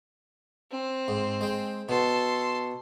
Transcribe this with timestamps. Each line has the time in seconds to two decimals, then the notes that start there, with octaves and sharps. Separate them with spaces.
0.71 C4
1.08 G#2
1.41 G#3 G5
1.89 B2 A4 C6